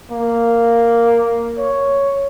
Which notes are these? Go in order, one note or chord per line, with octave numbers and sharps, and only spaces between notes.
A#3
C#5